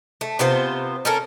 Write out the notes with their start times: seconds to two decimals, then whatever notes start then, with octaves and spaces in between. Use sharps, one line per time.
0.21 A3
0.39 C3 B3 F4 C5
1.05 C#4 A4 A#4